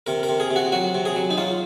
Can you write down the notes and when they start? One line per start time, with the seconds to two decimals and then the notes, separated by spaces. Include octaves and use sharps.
0.07 C3 A#4
0.23 A#4
0.29 C3
0.40 G#4
0.51 C3
0.56 F#4
0.72 F#3 F#4
0.95 C3
1.05 G#4
1.16 F#3
1.30 D#4
1.38 F#3 F4